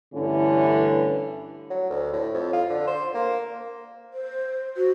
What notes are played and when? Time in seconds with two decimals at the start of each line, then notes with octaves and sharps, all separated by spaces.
0.15 G2 D3 E3 A3 C#4 E4
1.70 F#3
1.90 D2
2.13 A2
2.34 F2
2.53 F4
2.69 D3
2.87 C5
3.14 A#3
4.14 C5
4.77 F#4